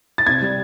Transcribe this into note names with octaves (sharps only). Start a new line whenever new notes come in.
A6
C3 G#6
G3